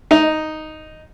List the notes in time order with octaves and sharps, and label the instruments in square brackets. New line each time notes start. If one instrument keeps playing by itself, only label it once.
[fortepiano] D#4